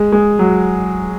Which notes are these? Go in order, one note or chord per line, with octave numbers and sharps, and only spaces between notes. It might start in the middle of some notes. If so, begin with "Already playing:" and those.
Already playing: G#3
G#3
F#3